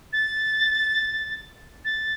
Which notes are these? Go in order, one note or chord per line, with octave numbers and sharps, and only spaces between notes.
A6
A6